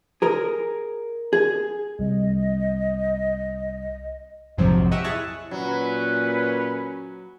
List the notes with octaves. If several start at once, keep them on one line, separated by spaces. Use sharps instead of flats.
G#4 A#4
G#4
C2 D#5
A#1 F2 G#2 C3 F3 F#3
G4 D#5 E5 F#5 C#6 E6
E4 G#4 C#5 F#5 A5 C#6
A#2 F#3 C#4 B4